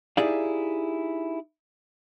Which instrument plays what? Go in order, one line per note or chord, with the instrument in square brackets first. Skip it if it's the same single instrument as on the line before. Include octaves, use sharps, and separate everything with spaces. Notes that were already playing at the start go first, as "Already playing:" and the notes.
[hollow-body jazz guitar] D#4 E4 G4 G#4 D5 F5